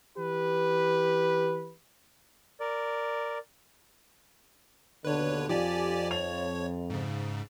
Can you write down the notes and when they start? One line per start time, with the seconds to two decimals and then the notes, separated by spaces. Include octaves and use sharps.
0.19 E3 G4 B4
2.60 A#4 D5
5.05 D#2 B2 D3 B4 C#5
5.49 F2 F3 G4 D5 G#5
6.11 C#5 F7
6.90 G#2 C#3